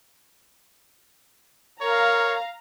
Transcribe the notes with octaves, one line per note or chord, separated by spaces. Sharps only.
A#4 C#5 F5 A#5